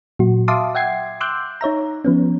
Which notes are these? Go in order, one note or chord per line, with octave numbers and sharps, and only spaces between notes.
A#2 F#3 F#4
E5 F5 A5 C6 D6 D#6
E5 F#5 G5 G#6 C7
C6 D6 E6 F#6 G6
D#4 C#5 E5 A#5
F3 B3 C#4